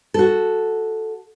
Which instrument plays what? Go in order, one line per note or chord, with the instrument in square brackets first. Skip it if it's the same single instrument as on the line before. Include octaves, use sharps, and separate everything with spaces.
[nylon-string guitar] F#4 A4